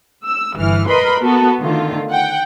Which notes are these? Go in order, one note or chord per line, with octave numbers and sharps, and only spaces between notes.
E6
G1 E3 F6
A#4 B4 D#5 B5 C6
B3 F#4 A4
D3 D#3 A3 F4
F#5 G5